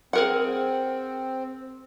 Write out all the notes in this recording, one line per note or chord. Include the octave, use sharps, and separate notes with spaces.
C4 G#4 A#4 F#5